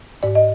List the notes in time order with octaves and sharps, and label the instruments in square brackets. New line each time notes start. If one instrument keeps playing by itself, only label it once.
[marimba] G#2 D5
D#5